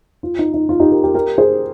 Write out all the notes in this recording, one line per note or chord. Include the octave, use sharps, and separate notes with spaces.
F4
D#4
D#4
F4
D#4 G4
G4 A#4
G4 A#4
G4 A#4
G#4 C5